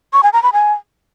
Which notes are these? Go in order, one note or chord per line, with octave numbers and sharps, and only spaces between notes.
C#6
G#5
A#5
B5
G#5